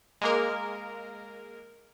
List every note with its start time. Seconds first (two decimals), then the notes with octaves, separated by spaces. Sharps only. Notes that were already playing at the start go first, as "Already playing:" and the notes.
0.21 G#3 A#3 A#4